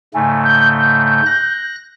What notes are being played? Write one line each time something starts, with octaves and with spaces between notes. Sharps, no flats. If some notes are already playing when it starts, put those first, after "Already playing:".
G#2 C#3 A3 G#5
G6
G6
F#6 A#6